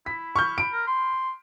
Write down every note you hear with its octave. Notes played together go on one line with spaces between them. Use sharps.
E4 B6
C#6 F6 G6
B5 D7
A#4
C6